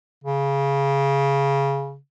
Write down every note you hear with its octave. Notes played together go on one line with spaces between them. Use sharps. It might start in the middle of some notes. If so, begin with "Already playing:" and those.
C#3